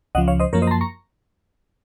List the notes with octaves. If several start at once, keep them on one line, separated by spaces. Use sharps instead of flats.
C#2 C#3 F3 D#5 F#5
C#5 F5
C5 D#5
F#2 F3 A#3 A#4 C#5
C5 D#5
A#5
A5 C6
A#5 C#6